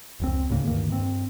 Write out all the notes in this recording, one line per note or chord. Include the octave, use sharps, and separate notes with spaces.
F1 C#2 C4
D2 A2 C#3 A#3
D2 G2 D#3 A#3
G2 C4